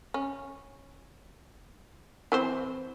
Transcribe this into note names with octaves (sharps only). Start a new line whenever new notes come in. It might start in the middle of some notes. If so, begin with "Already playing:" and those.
C#4
E3 C4 C5